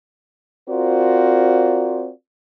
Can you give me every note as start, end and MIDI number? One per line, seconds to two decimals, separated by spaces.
0.69 2.11 60
0.69 2.11 65
0.69 2.11 66
0.69 2.11 70
0.69 2.11 72
0.69 2.11 74